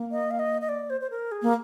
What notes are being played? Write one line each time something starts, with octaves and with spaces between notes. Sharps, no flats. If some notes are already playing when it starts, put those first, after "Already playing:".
Already playing: A#3
D#5
F5
D#5
D#5
D5
C5
C5
A#4
G#4
A#3